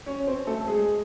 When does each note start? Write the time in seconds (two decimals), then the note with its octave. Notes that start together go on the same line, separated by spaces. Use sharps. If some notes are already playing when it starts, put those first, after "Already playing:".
0.06 C#4 C#5
0.27 C4 C5
0.47 A3 A4
0.67 G#3 G#4